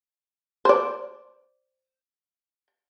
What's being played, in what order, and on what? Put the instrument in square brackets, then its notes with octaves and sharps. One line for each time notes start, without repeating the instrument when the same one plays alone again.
[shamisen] C5 D5